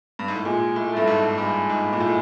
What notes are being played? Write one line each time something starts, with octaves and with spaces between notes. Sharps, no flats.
G2
G#2
A2
A#2 G#3
A2
A3
G2
G#2
G2 G#3
G#2
A#2
A2